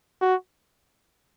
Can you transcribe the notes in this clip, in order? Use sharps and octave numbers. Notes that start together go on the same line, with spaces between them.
F#4